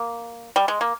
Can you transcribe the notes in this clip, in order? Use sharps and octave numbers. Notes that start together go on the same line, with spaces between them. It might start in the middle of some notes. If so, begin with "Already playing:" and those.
Already playing: A#3
G3
G#3
A#3